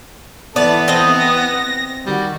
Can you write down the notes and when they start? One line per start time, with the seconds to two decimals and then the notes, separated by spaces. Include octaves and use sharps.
0.56 E3 B3 E4 A4 D5
0.88 C4 D#5
1.19 A#6
2.06 D#3 G3 F#4